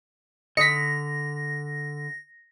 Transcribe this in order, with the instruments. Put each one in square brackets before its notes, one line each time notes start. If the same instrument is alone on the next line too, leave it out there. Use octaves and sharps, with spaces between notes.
[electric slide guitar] D3 [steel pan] D#5 [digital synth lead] A#6 [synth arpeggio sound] B6 C#7